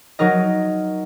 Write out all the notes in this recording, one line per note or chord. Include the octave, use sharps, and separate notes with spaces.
F#3 D#4 A#4 D#5